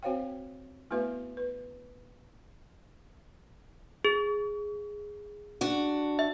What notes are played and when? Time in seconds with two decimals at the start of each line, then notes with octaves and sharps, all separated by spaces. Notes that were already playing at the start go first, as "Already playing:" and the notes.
0.03 C4 F#4 C5 C#5 F5 G5
0.91 A3 B3 E4 F#4 B4 E5
1.37 B4
4.05 G#4
5.61 D4 F#4
6.19 E5